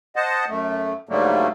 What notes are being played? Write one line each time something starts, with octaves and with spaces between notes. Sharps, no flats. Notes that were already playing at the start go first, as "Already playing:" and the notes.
C5 D#5 F#5 A5
F#2 A3
G#2 D3 F#3 G3 A3 A#3